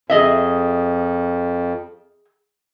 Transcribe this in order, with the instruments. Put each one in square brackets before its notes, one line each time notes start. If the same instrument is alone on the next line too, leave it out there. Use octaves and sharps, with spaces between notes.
[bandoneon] F2 [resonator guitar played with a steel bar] G#4 D#5 E5